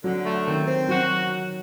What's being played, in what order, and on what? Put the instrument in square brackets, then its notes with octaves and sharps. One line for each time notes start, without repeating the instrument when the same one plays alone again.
[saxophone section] D3 [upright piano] F#3
[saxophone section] A3
[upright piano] D#3 [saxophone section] C4
[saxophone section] C4
[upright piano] F#3 [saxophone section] F#4